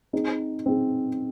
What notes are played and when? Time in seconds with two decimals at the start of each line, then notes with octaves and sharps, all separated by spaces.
0.13 C4 D#4 G#4
0.66 C4 D#4 G#4